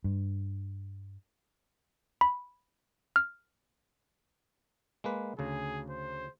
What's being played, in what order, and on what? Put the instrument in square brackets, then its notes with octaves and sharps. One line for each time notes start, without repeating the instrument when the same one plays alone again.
[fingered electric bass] G2
[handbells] B5
F6
[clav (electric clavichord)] G#3 A#3 B4
[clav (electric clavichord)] D2 C#3 [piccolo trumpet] G#4
[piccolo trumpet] C5